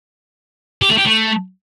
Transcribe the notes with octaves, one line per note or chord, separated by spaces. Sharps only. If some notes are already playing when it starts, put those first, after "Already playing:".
G4
A3
G4
A3